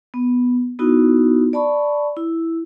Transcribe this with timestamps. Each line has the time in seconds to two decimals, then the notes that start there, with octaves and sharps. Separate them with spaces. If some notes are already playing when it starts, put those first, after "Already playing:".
0.14 B3
0.79 B3 D#4 E4 F#4
1.53 D5 A5 B5 C#6
2.17 E4